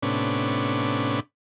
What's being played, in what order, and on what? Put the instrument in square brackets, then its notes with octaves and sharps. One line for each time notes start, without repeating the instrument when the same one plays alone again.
[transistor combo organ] A2 C3 B3 C#4 D4